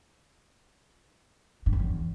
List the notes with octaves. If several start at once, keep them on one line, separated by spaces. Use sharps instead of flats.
G2
F#2
E2